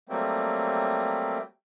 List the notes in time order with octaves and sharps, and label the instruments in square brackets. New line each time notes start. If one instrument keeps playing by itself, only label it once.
[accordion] F#3 G3 A3 A#3 C4